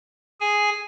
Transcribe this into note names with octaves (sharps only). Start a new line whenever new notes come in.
G#4 G#5